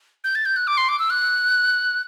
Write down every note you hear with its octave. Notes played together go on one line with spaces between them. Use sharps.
G6
A6
G6
F#6
D6
C6
D6
E6
F#6